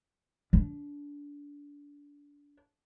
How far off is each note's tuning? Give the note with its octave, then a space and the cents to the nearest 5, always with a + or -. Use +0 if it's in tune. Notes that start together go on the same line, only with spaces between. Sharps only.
D4 -25